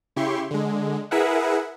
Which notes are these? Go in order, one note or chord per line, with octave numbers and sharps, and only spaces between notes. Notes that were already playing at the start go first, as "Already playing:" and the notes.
C#3 E4 G4 C6 C#6
D3 G#3
E4 G#4 A#4 B4 E5 F#5